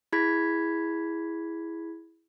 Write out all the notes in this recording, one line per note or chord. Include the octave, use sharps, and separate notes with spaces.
E4 G#4 B5 G#6 B6